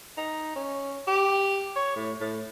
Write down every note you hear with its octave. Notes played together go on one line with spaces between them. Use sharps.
D#4
C#4
G4
C#5
A2
A2